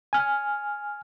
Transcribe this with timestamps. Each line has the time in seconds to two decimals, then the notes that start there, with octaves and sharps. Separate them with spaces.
0.13 G#5 F6